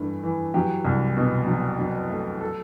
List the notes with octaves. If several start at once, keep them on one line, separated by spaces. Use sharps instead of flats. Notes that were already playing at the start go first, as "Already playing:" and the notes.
Already playing: G2 E3 A3
E3
F#3 G4
C2
B2
F#3
F#3
A3
A4